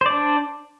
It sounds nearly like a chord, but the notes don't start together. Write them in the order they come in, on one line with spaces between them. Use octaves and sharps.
C5 D5 D4